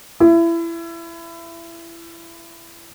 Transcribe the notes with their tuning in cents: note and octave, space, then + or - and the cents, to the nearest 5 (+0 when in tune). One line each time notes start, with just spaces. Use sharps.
E4 +25